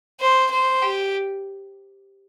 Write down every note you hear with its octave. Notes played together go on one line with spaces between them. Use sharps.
C5
C5
G4